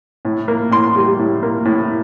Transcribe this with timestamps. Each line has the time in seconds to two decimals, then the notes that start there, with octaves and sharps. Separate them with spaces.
0.25 A2
0.48 A#3
0.71 A2 C6
0.96 G3
1.19 A2
1.43 A#3
1.65 A2